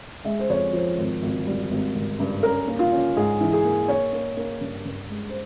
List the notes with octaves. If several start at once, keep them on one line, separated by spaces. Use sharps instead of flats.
G#3 E5
C5
F2 C#5
F3 C5
G#1
G#1
G3
G#1
G#1
G2
C#4 A#4
A#3
F4
C#4
G#2 G#4
E3
G#4
A#3
A#3 C#5
A#3
A#3
G2
G2
G#3
C5